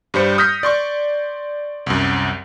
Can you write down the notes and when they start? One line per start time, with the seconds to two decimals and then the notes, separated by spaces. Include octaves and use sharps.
0.14 G2 G3 C5 C#7
0.38 D#6 F6 G6 A#6 B6
0.63 D5 C6 C#6
1.86 C2 F#2